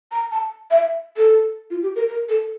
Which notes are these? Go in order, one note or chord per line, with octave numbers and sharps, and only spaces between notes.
A#5
A5
E5
A4
F4
G4
A#4
A#4
A4